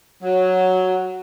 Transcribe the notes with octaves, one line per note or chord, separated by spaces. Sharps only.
F#3